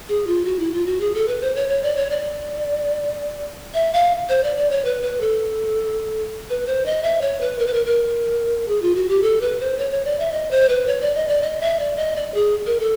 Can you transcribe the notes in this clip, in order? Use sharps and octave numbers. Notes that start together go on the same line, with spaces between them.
G#4
F4
F#4
E4
F4
F#4
G#4
A4
B4
C5
C#5
C#5
D5
C#5
D5
E5
F5
C5
D5
D5
C#5
B4
B4
A4
B4
C5
D#5
E5
C#5
B4
A#4
B4
A#4
A#4
G#4
F4
F#4
G4
A4
B4
C5
C#5
C#5
D5
E5
D#5
C5
B4
C#5
D5
D#5
D5
D#5
E5
D5
D#5
D5
G#4
A#4
A4